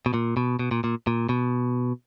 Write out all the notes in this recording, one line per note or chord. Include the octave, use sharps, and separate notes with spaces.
B2
A#2
B2
B2
A#2
A#2
A#2
B2